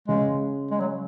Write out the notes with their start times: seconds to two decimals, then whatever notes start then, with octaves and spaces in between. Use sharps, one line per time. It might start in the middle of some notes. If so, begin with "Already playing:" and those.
0.08 C#3 G#3
0.71 G#3
0.80 F#3